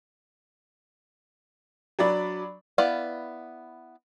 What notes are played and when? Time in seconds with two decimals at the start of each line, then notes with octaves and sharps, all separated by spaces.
1.99 F#3 D4 D5 B5
2.78 B3 E4 D5 F5